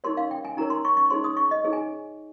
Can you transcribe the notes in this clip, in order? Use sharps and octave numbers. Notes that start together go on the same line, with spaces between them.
D#4 G4 A#4 C#5 C6
F5
G5
G#5
D#4 G4 A#4 C#5 A#5
C6
C#6
C#6
D#4 G#4 C#5 C6
D#6
C#6
D#5
D#4 G#4 C#5
G#5